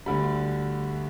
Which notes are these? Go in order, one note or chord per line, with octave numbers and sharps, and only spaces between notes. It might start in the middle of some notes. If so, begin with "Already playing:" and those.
D2 D3 G3 B5